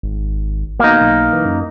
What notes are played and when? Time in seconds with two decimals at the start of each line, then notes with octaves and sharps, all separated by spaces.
0.03 G#1
0.80 B2 A#3 D#4
1.01 B1
1.33 E3
1.45 F#2